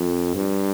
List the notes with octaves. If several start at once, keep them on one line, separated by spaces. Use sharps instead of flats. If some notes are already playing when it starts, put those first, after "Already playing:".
Already playing: F2
G2